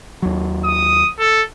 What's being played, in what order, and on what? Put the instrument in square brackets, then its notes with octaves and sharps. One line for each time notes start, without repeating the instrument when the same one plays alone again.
[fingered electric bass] D#2 F#3
[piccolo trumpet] D#6
A4